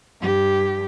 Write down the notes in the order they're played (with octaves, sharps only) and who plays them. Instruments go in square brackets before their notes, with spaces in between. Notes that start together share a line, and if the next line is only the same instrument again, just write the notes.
[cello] G2 G4